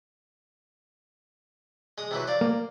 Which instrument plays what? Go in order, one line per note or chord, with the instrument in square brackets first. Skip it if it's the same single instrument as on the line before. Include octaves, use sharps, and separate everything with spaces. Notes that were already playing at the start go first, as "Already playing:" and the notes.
[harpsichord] G#3 D#6
C3 E3 F#3
C5 D5 F5
[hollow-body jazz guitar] A#3